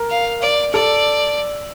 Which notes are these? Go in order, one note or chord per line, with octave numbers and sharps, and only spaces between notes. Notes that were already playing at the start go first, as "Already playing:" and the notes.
Already playing: A#4
F5
D5
A4 D5